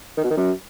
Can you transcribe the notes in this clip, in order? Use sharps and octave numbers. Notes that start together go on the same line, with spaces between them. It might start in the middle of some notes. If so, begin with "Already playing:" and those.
D#3
B2
D#3
F#2